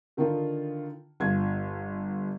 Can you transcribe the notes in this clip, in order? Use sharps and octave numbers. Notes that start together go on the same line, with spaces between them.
D3 D#3 D#4 F4
G1 F4 G#6